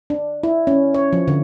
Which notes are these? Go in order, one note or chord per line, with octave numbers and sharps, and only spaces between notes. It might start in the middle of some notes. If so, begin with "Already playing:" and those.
D4
E4
C#4
C#5
F3
D3